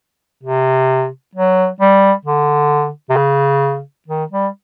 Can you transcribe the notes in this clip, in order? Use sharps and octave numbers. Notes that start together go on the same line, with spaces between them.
C3
F#3
G3
D3
C3
C#3
D#3
G3